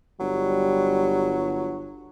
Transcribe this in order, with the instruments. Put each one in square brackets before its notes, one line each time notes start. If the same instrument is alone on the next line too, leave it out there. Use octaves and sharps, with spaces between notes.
[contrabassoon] G1 [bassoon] F#3 [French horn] G3